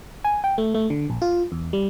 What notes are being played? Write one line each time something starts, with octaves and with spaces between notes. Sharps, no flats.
G#5
G5
A3
A3
D3
A#1
F4
E2
G3